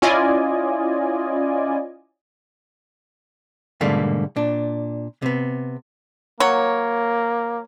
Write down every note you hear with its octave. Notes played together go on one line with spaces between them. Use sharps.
C#4 E4 F4 D5 D#5 G#5
G#2 B2 D3 G3 A3 A#3
A#2 D4
C3 B3
F#3 A#3 C#5